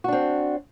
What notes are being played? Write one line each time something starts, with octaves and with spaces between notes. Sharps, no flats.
C4 D4 F#4